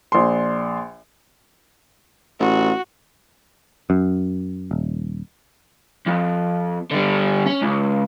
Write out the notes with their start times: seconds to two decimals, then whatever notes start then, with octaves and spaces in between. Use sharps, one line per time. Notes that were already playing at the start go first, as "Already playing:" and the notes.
0.12 A#1 C6
2.40 A1 F#4
3.90 F#2
4.71 D#1
6.07 F2
6.91 D3 G3
7.46 C#4
7.62 C#2